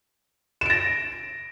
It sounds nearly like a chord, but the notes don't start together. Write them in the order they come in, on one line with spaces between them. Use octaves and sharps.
E7 D7 A#6